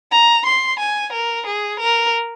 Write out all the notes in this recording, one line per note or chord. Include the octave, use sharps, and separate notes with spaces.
A#5
C6
G#5
A#4
G#4
A#4